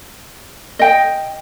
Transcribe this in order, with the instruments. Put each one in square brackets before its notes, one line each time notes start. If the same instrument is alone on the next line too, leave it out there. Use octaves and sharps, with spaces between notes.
[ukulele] D#5 G5